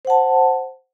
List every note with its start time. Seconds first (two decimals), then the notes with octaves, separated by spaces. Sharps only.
0.05 C5
0.07 F#5
0.10 A5